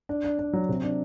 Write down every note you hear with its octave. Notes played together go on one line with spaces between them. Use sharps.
D4
D4
D4
F#3
C3
D4